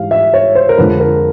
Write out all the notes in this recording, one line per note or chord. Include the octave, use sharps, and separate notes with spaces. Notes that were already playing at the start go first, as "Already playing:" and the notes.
Already playing: G#2 E3 G3 F5
E5
C#5
C5
A#4
F2 D3 F3 G#3 B4
A#4